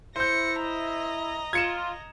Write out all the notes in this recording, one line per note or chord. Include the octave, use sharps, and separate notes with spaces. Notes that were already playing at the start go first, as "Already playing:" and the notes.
E4 C5 G6 A#6 C#7
D#5 A#5
F4 G#6 C#7 E7